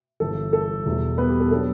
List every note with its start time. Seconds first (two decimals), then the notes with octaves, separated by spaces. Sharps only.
0.20 G1 G2 E3 A4
0.53 A4
0.86 E2 B2 G3
1.18 B3 B4
1.29 G4
1.40 A4
1.51 F#3 B3 D4 A4